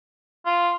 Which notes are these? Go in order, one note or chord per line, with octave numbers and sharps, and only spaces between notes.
F4